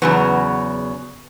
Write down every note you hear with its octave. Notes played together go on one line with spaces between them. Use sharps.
E2 C#3 F#3 B3